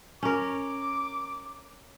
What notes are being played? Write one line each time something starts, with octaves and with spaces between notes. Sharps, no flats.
C#4 A#4 D6